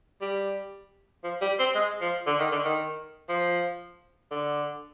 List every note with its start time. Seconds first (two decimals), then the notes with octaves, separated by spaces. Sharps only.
0.22 G3
1.24 F3
1.41 G3
1.59 C4
1.75 G#3
2.01 F3
2.27 D3
2.39 D#3
2.52 D3
2.65 D#3
3.29 F3
4.31 D3